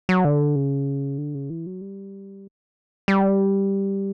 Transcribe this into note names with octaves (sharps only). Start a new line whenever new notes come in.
F#3
D3
C#3
D3
C#3
E3
F#3
G3
G3